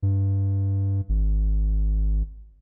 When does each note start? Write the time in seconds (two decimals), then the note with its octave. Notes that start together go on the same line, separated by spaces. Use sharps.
0.02 G2
1.09 G#1